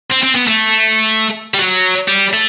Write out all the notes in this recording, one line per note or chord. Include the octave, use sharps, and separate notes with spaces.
C4
C4
B3
A3
G3
F#3
G3
A3